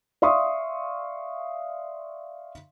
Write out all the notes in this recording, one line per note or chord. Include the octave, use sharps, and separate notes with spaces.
D5 E5 F5 C6 C#6 D#6